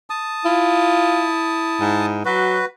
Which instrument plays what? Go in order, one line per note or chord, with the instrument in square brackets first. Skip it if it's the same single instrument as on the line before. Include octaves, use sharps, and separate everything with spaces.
[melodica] A5 D#6
[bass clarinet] E4 [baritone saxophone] F4
[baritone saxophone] G#2
[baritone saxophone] F#3 [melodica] F#4 B4